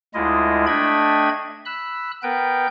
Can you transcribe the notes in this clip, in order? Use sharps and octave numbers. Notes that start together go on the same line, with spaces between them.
D2 G#3 E4 F4 D#5
A3 D4 D#5 G5 B5 G#6
B5 E6 F#6
B3 A#4 B4 G5 G6